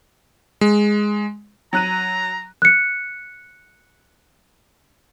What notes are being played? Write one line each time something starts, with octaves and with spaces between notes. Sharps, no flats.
G#3
F#3 A#5 F#6 D#7
F#6 C#7